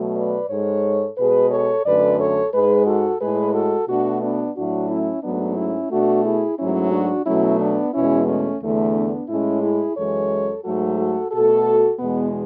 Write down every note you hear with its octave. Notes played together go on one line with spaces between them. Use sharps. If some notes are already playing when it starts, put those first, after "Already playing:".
Already playing: B2 F#3 A3
B4 D5
G#2 G#3 A4 C#5
B2 G#3 G#4 B4
A4 C#5
F#2 D3 A3 B4 D5
A4 C#5
G#2 G#3 G#4 B4
F#4 A4
A2 G#3 G#4 B4
F#4 A4
B2 A3 D4 F#4
B3 D4
A2 F#3 A3 D4 F#4
C#4 E4
G#2 F#3 A3 B3 D4
C#4 E4
B2 A3 D4 F#4
E4 G#4
G#2 F#3 A3 C#4 E4
D4 F#4
B2 F#3 A3 C#4 E4
B3 D4
E2 B2 G#3 C#4 E4
A3 C#4
E2 D3 A3
B3 D4
A2 G#3 C#4 E4
E4 G#4
F#2 E3 G#3 A4 C#5
G#2 F#3 A3 F#4 A4
F#4 A4
B2 A3 F#4 A4
E2 B2 G#3 B3